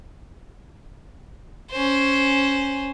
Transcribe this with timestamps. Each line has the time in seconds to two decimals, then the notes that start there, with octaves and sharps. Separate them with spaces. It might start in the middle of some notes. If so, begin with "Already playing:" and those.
1.71 C#4 C5